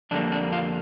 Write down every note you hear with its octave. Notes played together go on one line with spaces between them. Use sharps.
F2 D3 G3 A#3 D4
D4
F4